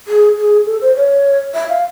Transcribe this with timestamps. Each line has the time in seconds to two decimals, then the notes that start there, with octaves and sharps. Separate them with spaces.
0.08 G#4
0.37 G#4
0.66 A4
0.81 C5
0.96 C#5
1.54 E5
1.69 F5